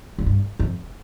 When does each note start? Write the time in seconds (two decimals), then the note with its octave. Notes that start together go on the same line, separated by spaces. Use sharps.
0.18 G#2
0.26 G2
0.59 F2